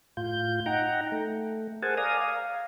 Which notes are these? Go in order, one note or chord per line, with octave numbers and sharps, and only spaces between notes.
A2 F4 G6
D#4 F#5 G5 A#5
A3
G#4 A#4 C5 F#5 G#5 A5
D5 F5 G#5 A#5 D#6
F5